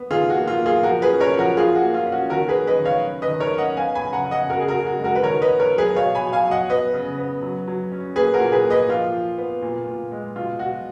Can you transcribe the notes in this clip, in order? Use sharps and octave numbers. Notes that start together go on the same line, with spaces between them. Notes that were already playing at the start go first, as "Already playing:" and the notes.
Already playing: B3
D#3 F4 G#4
F#4
A#3
F4
A#3
F4 G#4
F3 F#4 A#4
G#4 B4
C#4
A#4 C#5
F3
F#4 A#4
F3 F4 G#4
F#4
A#3
F4
C#4
F#4
D#3 F#4 A#4
G#4 B4
C#4
B4 D#5
D#3
C#5 F5
C#4
B4 D#5
D#3
A#4 C#5
C#4
D#5 F#5
B3 F5 G#5
G#5 B5
C#3
F#5 A#5
C#3
D#5 F#5
C#3 F#4 A#4
G#4
F#4 A#4
C#3
F#4
G#3
F#4 A#4
B4
D#3 A#4 C#5
B4 D#5
B3
A#4 C#5
F#3
G#4 B4
B2 C#5 F5
G#5 B5
B2
F5 G#5
F#3
D#5 F#5
B3 B4 D#5
C#3
B3
F#3
F#3
C#4
A#3 G#4 B4
F#4 A#4
A#2
G#4 B4
A#3
B4 D#5
F3 F4
F3
B3
A#2
A#2
G#3
B2 F4
B2 F#4